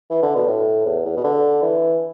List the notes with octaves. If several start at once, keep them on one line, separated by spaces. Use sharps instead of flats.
E3
D3
B2
A2
E2
E2
B2
D3
E3